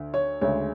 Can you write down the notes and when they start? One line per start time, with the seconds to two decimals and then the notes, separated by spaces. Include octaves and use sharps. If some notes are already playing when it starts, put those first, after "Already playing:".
Already playing: D2 D3
0.14 C#5
0.41 D2 C#3 G#3 C#5